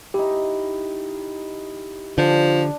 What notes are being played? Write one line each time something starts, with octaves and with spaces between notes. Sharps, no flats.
D#4 E4 G4
D3 F3 D4